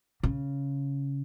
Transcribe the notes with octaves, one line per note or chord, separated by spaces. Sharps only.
C#3